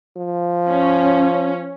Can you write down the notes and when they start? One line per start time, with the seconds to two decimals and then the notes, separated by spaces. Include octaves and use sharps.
0.17 F3
0.69 C#4